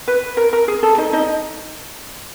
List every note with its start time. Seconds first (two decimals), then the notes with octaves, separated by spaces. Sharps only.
0.08 B4
0.37 A#4
0.53 A#4
0.68 G#4
0.83 A4
0.98 D#4 D#5
1.13 D#4 D#5